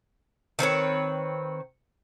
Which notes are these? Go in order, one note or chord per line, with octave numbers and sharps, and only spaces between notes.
D#3 C4 B4 C#5